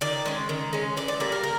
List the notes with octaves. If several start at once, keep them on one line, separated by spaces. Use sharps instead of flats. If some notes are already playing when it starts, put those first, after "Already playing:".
D#3 D5
G#3 C#4
D#3
G#3 C#4
E3 D5
D5
G3 A#3 D5
A#4
A#4